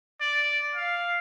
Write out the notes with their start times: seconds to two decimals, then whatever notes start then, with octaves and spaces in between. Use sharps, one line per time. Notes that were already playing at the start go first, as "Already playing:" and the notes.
0.21 D5
0.75 F5